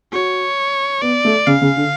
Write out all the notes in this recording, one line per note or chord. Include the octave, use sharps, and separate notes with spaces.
F#4 C#5
B3 D5
A3
C#3 F5
C#3
D3